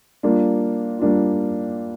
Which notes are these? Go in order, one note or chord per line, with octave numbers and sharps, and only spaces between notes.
G3 A#3 D4 F4
G3 A#3 D4 F4